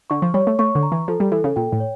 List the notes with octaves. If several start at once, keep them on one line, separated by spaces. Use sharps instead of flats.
D3 C#6
F3
G3 C#5
A3
A3 C#6
D3
A#5
E3
F3 A4
G3
E3 A4
C#3
A#2 G5
A2
C#5